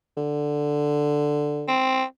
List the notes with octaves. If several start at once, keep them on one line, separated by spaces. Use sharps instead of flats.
D3
C4